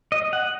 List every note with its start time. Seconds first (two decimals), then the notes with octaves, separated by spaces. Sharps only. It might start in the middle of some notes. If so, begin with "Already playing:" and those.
0.12 D#5
0.33 F#5